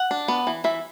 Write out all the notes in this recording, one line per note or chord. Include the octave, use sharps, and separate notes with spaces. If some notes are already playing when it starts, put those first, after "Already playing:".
Already playing: F#5
D4
B3
E3
E3 E5